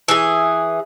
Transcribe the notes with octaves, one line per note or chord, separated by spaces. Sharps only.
E3 G#4